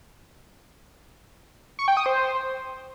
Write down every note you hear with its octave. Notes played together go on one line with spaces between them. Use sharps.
C#6
G5
D#6
C5